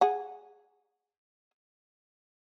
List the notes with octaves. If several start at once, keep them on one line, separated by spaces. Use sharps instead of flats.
G#4 F#5